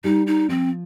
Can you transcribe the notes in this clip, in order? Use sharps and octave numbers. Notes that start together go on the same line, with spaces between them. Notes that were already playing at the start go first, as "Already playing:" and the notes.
G3 D#4 G4
D#4
F3 C4 F4